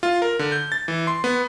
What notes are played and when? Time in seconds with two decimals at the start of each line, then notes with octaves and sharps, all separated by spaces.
0.03 F4
0.22 A#4
0.39 D3
0.52 G6
0.72 A6
0.88 E3
1.07 C6
1.24 B3